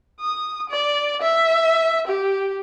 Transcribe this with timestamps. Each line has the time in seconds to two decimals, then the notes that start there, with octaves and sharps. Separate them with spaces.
0.20 D#6
0.69 D5
1.22 E5
2.08 G4